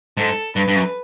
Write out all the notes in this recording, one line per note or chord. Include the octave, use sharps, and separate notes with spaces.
G#2 A4
G2 B4
G2
F#2